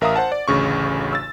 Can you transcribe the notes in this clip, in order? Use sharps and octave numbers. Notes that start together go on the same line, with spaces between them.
A1 A#4 E5 F5 A#5 D#6
C5 F#5 A5
D5
A1 D2 C#3 C#6
E6 A6